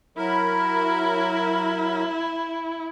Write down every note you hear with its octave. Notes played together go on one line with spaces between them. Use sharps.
F#3 E4 A#4 B5